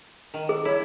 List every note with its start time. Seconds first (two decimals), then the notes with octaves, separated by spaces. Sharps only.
0.34 D#3
0.49 G#4
0.65 E4 C#5